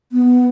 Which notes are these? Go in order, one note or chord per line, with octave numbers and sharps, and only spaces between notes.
B3